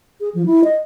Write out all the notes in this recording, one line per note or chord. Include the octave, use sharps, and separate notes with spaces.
G#4
F3
E4
D#5